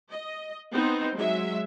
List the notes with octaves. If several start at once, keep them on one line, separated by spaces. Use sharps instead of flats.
D#5
B3 C4 D#4 C5
F#3 G#3 E5